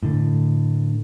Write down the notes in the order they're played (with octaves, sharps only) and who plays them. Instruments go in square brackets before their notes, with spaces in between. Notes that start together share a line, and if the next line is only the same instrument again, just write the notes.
[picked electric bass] A2 D3